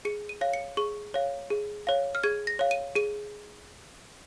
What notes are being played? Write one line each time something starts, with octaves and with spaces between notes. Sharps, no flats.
G#4 C#7
D#7
C#5 F5
C#7
G#4 C#6
C#5 F5
G#4
C#5 F5
F6
G#4 G#6
A#6
C#5 F5
D#7
G#4 D#7